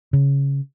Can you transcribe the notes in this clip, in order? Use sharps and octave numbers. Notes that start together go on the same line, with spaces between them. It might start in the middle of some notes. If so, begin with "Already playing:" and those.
C#3